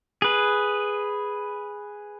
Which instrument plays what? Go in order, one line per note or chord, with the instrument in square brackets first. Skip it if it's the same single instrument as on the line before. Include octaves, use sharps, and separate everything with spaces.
[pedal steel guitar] G#4 B4